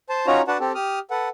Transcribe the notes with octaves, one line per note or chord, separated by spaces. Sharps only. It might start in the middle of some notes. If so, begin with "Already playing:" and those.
C5 A5
C#4 D#4 F4 F#4 C#5 A#5
D4 F#4 B4 F#5 A5
C4 G4 A4
G4 D#6 F6
A4 B4 F#5